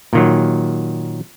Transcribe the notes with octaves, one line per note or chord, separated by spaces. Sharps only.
A#2 D#3 F#3